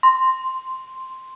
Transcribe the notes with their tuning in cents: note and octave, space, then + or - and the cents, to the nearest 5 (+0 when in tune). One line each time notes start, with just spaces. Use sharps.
C6 -5